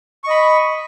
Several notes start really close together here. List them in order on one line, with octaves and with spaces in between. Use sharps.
C#6 D#5 B5